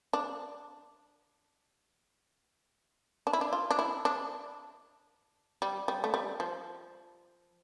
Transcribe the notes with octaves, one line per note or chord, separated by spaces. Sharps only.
D4
D4
E4
D4
F4
D4
E4
D4
G3
G3
A3
G3
F3